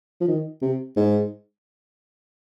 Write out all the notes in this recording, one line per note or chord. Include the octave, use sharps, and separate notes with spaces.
F3
D#3
C3
G#2